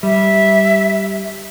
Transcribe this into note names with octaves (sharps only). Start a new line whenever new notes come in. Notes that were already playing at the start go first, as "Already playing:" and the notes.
G3 E5